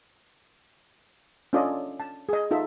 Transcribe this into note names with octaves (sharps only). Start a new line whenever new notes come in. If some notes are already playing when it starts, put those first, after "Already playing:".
C#4 D4 F4 A4 D5 D#5
A5
G#4 D#5
D#4 F4 A4 E5